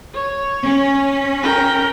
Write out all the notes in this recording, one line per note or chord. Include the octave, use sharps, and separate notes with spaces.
C#5
C#4
A#4 G5